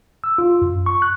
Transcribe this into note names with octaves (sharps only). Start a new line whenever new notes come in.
E6
F4
F#2
C#6
F#6